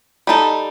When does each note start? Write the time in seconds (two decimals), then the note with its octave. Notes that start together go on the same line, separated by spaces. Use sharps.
0.27 G3 D#4 A4